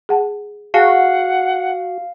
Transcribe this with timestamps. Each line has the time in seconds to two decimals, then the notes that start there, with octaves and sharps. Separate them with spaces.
0.09 G#4 F#5 A5
0.74 F#4 G#4 F5 F#5 G#5 A5